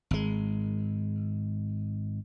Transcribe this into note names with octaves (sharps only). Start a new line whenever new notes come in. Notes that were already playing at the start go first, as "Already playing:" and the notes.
G#1 G#3